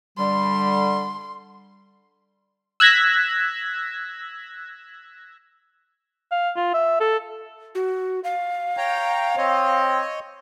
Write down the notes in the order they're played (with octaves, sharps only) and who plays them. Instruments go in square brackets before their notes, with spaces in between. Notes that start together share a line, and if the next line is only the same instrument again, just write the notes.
[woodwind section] D3 G3 [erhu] C6
[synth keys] E6 F#6 G#6 A#6 B6
[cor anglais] F5
F4
E5
A4
[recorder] F#4
F5
[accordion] C#5 G5 A#5
[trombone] C4 [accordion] C#5 D#5